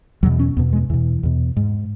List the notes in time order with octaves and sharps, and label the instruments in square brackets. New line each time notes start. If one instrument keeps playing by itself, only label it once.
[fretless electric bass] E2 B2 F#3
C#4
E2 B2 B3
G#3
E2 B2 E3
E2 B2
G#2